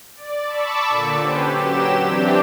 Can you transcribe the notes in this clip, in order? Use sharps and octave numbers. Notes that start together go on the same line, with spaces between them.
D5
A5 B5 C#6 D6 E6
A#2 D3
C#4 G4 B4 C5
F#3 G4 E7
E3 C4 D4 G4